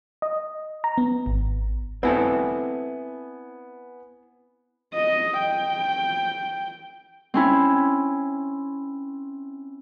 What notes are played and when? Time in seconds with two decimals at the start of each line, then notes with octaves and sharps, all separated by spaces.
0.22 D#5
0.84 A#5
0.98 B3
1.26 G#1
2.03 B3 C4 E4 A4 G#5
4.94 D#5
5.40 G5
7.34 C4 C#4 E4